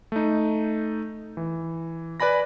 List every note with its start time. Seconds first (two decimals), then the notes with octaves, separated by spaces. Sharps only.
0.12 A3 D#4
1.37 E3
2.20 B4 D5 G#5 B5 A#6